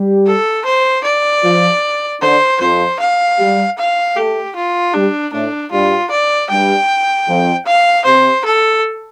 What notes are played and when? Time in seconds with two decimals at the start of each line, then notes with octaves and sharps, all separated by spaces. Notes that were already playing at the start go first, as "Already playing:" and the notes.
Already playing: G3 G4
0.27 A4
0.65 C5
1.04 D5
1.44 F3 F4
2.22 D3 D4 C5
2.61 F2 F3 C5
3.00 F5
3.38 G3 G4
3.78 F5
4.17 A3 G4 A4
4.56 F4
4.94 G3 D4 G4
5.33 A2 A3 D4
5.72 G2 G3 F4
6.11 D5
6.50 G2 G3 G5
7.28 F2 F3
7.67 F5
8.05 C3 C5
8.45 A4